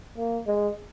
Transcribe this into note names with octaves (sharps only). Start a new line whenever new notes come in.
A#3
G#3